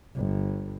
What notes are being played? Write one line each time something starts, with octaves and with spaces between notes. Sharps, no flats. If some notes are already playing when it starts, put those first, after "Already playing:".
G1